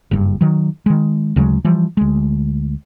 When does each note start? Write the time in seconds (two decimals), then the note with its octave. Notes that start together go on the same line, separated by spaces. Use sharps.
0.11 F#1 G2
0.41 D#3 F#3
0.86 D#3 G#3
1.36 D2 C#3 F#3 G#3
1.65 E3 F3 G3
1.97 D2 G#3